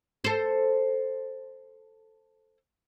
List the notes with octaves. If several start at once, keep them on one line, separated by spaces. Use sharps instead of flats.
A4 C5